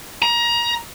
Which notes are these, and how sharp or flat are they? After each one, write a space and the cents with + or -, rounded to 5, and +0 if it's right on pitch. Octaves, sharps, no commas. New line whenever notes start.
A#5 +25